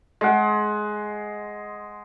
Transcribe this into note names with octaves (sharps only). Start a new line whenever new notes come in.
G#3 F#5